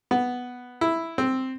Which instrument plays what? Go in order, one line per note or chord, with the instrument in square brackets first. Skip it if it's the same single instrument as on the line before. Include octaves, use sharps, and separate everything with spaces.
[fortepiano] B3
E4
C4